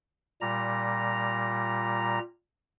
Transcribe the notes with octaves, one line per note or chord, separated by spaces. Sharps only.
A#2 G3 A#5